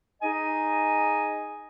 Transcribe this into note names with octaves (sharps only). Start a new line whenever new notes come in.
D#4 G#4 D#5 G#5